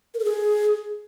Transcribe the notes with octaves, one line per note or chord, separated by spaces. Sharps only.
A#4
A4
G#4